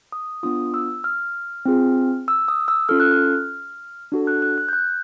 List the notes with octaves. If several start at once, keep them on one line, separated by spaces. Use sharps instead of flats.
D#6
B3 D4 F4 D#6
E6
F6
C4 F4 G#4
E6
D#6
E6
C#4 F4 A4 F6
F#6
F6
D4 F#4 A4
F#6
F#6
F#6
G6
F#6